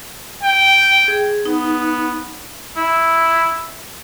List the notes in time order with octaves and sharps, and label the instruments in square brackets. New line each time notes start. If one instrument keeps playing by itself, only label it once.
[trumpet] G5
[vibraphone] G#4
[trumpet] B3 [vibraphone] D#4
[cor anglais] E4